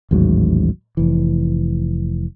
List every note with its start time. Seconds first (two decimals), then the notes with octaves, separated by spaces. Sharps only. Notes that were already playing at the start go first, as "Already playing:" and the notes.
0.11 A1 D#2 G#2 F#3
0.97 F1 E3